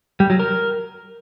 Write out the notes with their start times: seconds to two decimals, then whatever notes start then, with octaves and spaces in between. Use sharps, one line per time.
0.20 G3
0.30 F#3
0.39 A#4